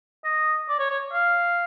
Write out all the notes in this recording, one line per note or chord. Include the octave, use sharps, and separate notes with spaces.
D#5
D5
C#5
C#5
F5